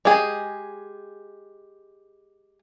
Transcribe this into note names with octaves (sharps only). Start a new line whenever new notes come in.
G#3 G4 G#4